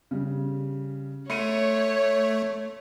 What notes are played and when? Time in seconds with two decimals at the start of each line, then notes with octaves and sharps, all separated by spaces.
0.11 C#3 G3
1.30 A3 C#5 C6 C#7 D#7